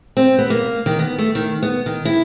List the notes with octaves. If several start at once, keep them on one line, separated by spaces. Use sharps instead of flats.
C4
B3
A#3
D#3
B3
A3
D#3
B3
D#3
E4